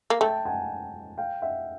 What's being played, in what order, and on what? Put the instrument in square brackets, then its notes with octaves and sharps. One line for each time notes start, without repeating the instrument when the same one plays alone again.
[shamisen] A#3
[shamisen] A3 [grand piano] G5 A5
[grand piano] F#5 G#5
F5 G5
E5 F#5